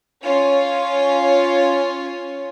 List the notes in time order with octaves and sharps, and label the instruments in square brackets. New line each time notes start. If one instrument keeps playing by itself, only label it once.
[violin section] C#4 F4 C#5